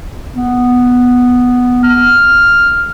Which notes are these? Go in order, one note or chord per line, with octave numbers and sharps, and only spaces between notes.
B3
F6